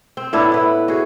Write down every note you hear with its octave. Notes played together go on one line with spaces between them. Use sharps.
C4
A2 B3 D4 E4
E4 B4
F#4 G#4